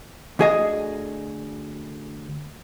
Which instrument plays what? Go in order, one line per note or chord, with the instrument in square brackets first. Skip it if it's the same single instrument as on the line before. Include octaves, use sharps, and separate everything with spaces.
[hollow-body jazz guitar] D2 G#4 D#5